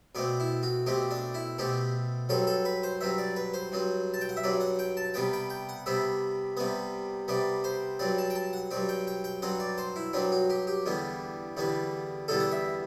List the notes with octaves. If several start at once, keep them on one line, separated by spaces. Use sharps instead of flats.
B2 A3 C4 D5
E4
F#4
B2 A3 C4 G4
D4
E4
B2 A3 C4 G4
G2 F#3 C4 A4
A4
B4
C5
G2 F#3 C4 E5
D5
B4
C5
G2 F#3 C4
A5
G5
F#5
E5
G2 F#3 C4 D5
F#5
G5
A5
C3 G3 B3 G5
G5
G5
F#5
C3 G3 B3 E5
C3 G3 B3
C3 G3 B3 D5
C5
G2 F#3 C4 D5
A5
G5
A5
F#5
G2 F#3 C4 D5
G5
G5
G5
G2 F#3 C4 F#5
D5
C5
E4
G2 F#3 C4 D4
F#4
G4
G4
E2 D3 G3 B3
E2 D3 G3 B3
E2 D3 G3 B3 A4
F#5
E5